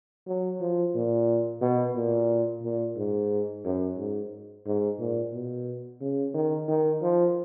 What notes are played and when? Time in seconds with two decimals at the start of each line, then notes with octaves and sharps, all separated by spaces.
0.27 F#3
0.60 F3
0.94 A#2
1.61 B2
1.96 A#2
2.63 A#2
2.96 G#2
3.65 F#2
3.98 G#2
4.66 G#2
4.99 A#2
5.33 B2
6.01 C#3
6.34 D#3
6.68 D#3
7.02 F3